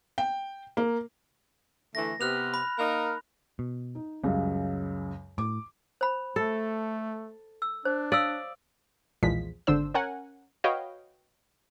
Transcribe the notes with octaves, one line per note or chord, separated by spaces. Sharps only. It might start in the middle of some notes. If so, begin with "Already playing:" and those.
G5
A#3
D3 E3 A3 A#6
C3 B3 F6 F#6 F7
B5
A#3 D#4 A#4
B2
D#4
C#2 F#2 C#3 G3
A2 D6
C5 B5
A3 A4
E6
D4 C5
D5 F5 D#6 E6
B1 E2 A#2 F3 G#3 B6
G#1 D3 D4 C5 E6
C#4 A#4 F#5 G#5
F#4 B4 C#5 D#5 F5 G5